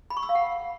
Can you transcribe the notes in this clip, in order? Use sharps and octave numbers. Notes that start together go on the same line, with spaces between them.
B5
C#6
E6
F5
F#5